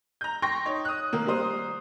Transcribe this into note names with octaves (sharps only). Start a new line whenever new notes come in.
A#5 G6
G5 C6 C#6 A#6
D#4 C#5
D#6 F#6
D#3 A#3
G3 A#3 C5 D#6